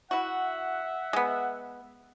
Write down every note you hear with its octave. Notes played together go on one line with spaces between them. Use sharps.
E4 F#4 E5 F#5
G#3 B3